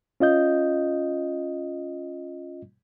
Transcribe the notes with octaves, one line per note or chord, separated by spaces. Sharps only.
C#4 F4 D#5 G6